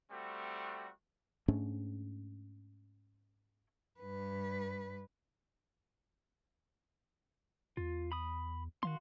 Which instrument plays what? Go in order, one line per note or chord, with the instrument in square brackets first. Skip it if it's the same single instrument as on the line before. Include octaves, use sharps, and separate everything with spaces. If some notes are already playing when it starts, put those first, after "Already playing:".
[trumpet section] G3 A3 C4 F#4
[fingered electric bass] G#2 A3 C#4 D4
[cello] G2 B4
[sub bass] E2 [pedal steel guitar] F4
[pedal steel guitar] B5 D#6
[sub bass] D#3 [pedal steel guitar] F#4 F5 C6